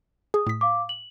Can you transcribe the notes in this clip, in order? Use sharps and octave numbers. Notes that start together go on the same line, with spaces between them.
G#4 D#6
A2 B6
F5 D6
F#7